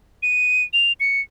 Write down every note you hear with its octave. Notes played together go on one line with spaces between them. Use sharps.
D#7
F7
C#7